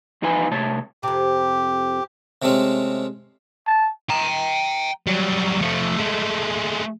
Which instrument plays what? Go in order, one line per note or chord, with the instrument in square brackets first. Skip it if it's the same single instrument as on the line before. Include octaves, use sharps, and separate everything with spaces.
[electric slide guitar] E2 F3 D#4 F4 B4 G#5
C3 A3 C#5 A5
[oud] F2 C3 [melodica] G4
[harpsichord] C3 G#3 A3 C4 C#4
[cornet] A5
[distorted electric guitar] G5 A#5
F#3 G3
F3 A3
G#3 A3